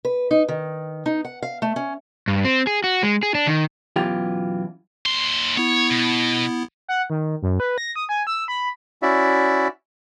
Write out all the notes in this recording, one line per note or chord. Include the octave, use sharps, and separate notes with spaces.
B4
D#4
D#3
D#4
F#5
F5
A3
C#4
G2
C4
G#4
F#4
G#3
G#4
D4
D#3
F#2 B2 E3 F4 G4
D#2 C6
B3 E4 C#5
B2
F#5
D#3
F#2
B4
A#6
D#6
G#5
E6
B5
C#4 E4 F#4 D5 E5